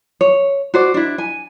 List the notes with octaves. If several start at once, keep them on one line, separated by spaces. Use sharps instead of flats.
C#5
F#4 C5 D5
D4 E4
G#5